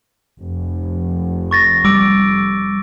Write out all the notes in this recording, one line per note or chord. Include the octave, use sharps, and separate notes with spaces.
F1
C#6 A6 A#6
G3 D6 E6 D7